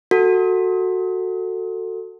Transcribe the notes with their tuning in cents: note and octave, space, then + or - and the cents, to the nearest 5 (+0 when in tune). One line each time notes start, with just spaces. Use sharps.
F#4 +0 A4 +20